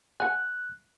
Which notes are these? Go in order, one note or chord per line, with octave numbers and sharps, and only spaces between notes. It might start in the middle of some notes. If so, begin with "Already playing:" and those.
F#5 G#5 F#6